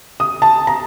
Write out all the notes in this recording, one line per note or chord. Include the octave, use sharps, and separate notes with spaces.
D#6
A5
A#5